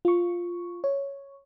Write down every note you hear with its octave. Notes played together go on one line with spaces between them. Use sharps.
F4 C#6
C#5